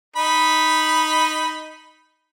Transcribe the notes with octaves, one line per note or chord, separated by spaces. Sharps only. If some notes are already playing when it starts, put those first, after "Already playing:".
D#4 B5